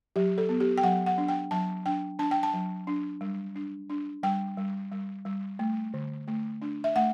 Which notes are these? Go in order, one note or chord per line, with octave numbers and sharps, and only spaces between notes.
F#3 G4
A4
B3
G4
G5
F#3 F#5
F#5
D4
G5
F#3 A5
D4 G5
D4 A5
G5
A5
F#3
D4
G3
D4
D4
G3 G5
G3
G3
G3
A3
D3
A3
D4
E5
A3 F#5